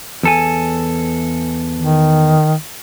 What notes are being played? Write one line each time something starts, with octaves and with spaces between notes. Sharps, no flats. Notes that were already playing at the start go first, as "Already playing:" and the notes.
E2 A4 G#5
D#3